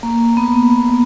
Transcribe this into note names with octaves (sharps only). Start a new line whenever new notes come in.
A#3
B3